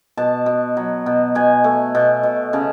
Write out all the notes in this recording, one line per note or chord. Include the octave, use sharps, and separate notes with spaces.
B2 A5
B2
F#3
B2
B2 G#5
A3
B2
B2
C#3 A5